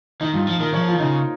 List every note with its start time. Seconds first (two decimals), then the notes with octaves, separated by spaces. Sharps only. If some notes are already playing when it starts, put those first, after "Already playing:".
0.21 D#3 D#4
0.34 G2 F4
0.47 F3 F4
0.60 D#3 A#4
0.73 F3 C#5
0.88 F4
0.94 D#3
1.00 C#3 D#4